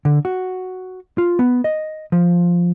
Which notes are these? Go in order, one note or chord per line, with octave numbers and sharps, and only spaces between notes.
D3
F#4
F4
B3
D#5
F3